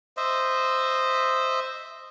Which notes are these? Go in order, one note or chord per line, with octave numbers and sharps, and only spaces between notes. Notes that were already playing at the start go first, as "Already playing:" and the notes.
C5 D#5 E5